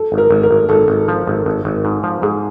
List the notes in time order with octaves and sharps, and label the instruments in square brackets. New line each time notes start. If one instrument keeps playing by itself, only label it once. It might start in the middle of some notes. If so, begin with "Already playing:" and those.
Already playing: [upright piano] A4
[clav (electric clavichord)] G#1
[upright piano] A#4
[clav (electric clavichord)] G#1
[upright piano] A#4
[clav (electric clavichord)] G#1
[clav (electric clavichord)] G#1 [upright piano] A4
[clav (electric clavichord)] G#1
F3
G#1
G#1
G#1
G#2
F3
[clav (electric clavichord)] G#2 [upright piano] G#4